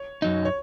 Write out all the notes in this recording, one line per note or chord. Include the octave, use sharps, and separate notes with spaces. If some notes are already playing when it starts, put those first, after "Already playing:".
Already playing: C#5
F#2 F#3 D#4
C#5